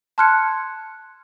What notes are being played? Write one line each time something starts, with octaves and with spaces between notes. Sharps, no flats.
A5 C6 F6 F#6 G#6 C#7